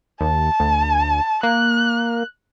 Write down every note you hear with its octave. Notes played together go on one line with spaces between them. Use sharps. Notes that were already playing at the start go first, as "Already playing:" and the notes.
D#2 A5
D2
A#3 F#6